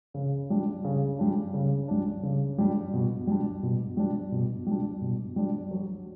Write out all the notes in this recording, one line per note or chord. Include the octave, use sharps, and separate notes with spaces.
C#3
G3 D4
C#3
G3 D4
C#3
G3 D4
C#3
G3 D4
B2
G3 D4
B2
G3 D4
B2
G3 D4
B2
G3 D4
F#3